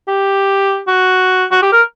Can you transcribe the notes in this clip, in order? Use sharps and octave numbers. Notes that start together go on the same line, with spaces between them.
G4
F#4
F#4
G4
A#4